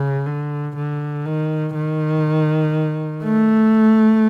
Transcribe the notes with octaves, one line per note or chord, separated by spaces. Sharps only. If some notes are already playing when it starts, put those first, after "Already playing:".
Already playing: C#3
D3
D3
D#3
D#3
A3